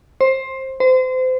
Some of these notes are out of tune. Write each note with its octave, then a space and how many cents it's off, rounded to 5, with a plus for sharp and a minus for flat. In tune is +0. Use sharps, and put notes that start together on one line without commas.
C5 +15
C5 -30